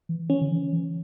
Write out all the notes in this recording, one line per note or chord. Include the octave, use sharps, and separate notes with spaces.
E3
E3 C#4
D3
E3
E3